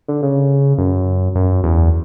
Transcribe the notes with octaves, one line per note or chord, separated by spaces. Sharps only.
D3
C#3
F#2
F#2
E2